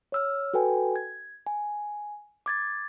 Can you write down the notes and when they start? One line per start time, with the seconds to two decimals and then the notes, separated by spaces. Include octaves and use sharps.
0.12 C#5 E6 F6
0.54 F#4 A4 B4 G5 G#5
0.96 G#6
1.47 G#5
2.46 D6 G#6 A6